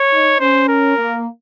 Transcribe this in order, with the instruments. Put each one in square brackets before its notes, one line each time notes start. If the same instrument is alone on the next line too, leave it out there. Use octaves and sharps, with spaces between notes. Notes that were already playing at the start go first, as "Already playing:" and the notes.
Already playing: [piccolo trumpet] C#5
[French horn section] D#4
[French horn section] C#4 [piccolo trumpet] C5
[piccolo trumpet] A#4
[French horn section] A#3